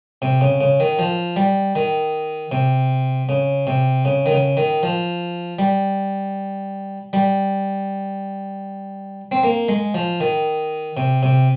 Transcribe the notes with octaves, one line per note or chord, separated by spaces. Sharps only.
C3
C#3
C#3
D#3
F3
G3
D#3
C3
C#3
C3
C#3
D#3
C#3
D#3
F3
G3
G3
C4
A#3
G#3
F3
D#3
C3
C3